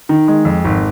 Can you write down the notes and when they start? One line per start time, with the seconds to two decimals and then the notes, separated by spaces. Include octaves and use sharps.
0.09 D#3
0.28 G#3
0.45 F2
0.65 G#1